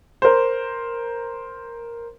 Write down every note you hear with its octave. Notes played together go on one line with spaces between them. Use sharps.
A#4 C5